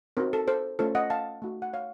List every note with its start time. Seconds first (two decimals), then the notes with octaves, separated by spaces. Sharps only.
0.17 C4 D#4 F#4 A#4
0.33 A4
0.48 A4 C5
0.79 A3 C#4 F4 A4 C5
0.95 D#5 F#5
1.10 F5 A5
1.42 A3 D#4 F#4
1.62 F#5
1.73 C#5 F5